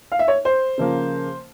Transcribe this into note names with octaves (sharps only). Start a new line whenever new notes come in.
F5
E5
C#5
C5
C#3 F3 A#3